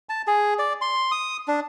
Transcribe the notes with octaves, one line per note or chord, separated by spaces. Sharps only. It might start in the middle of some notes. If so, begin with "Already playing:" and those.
A5
G#4
D5
C6
D#6
D4